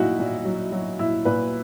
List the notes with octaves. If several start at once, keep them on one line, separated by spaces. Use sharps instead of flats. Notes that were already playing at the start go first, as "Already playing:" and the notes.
Already playing: A#2 F#3 D#4 E4 F#4
A#2
F#3
F#3
A#2 E4
A#2 B4